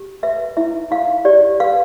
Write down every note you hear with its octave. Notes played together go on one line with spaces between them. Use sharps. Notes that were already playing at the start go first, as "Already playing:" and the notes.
Already playing: G4
B4 E5
E4 E5
E4 F5
G4 D5
B4 F5